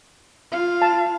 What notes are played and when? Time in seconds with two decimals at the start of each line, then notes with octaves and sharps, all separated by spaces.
0.52 F4 F5
0.82 A5